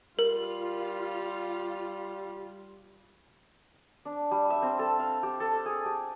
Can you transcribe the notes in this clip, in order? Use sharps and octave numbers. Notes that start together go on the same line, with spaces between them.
G3 F4 A#4
D4
G3
E5
C4
A4
F5
G4
A4
G#4
G4